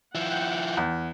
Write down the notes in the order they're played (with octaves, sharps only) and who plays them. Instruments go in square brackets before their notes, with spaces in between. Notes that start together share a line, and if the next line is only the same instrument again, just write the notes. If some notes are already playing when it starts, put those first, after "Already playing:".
[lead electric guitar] F3 E4 [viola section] F#5 G5
[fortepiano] E2